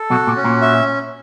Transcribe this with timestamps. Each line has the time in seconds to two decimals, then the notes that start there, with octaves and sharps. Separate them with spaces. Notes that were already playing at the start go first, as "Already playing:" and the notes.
Already playing: A4
0.10 B1 B2 F#4
0.27 A#2
0.36 C#4
0.44 A#2
0.62 E5